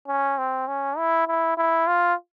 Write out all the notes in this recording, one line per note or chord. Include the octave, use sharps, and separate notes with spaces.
C#4
C4
C#4
E4
E4
E4
F4